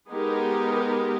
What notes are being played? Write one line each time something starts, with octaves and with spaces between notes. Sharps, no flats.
G#3 B3 D#4 G4 A#4